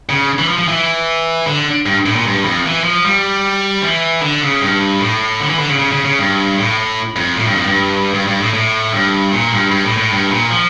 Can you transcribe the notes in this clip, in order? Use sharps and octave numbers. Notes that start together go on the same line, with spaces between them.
C#3
E3
F3
F3
E3
D3
G2
A2
A#2
G2
F2
E3
F3
G3
E3
D3
C#3
G2
A2
D3
E3
D3
C#3
C#3
C#3
C#3
G2
A2
F2
A2
G2
F2
G2
G2
G2
A2
A2
G2
A#2
G2
G2
A2
A2
G2
A#2
F3